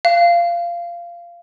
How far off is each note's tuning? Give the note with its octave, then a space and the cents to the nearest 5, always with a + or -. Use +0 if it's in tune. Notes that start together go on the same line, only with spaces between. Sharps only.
F5 -20